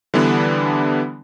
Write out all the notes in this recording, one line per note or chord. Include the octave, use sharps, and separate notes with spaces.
D3 E3 G3 B3 D4